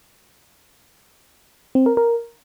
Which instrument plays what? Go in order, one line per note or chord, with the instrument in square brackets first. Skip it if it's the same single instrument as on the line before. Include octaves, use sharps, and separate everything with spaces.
[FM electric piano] C4
A#4
A#4